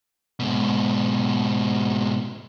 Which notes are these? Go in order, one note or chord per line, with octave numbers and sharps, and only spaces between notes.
G#2 B2